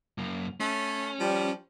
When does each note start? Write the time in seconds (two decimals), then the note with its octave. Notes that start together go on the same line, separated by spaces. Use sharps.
0.18 F#2 A#3
0.60 A3 C#4
1.20 F3 G3